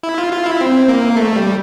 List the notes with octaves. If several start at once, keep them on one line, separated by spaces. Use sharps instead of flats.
E4
F4
F4
E4
C4
A#3
A3
G3